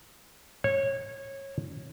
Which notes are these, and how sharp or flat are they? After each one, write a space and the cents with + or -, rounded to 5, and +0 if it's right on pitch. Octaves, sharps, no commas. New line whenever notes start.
C#5 -20